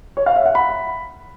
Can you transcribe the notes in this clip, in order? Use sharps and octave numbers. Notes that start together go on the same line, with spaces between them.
C#5
F5
E5
F#5
B5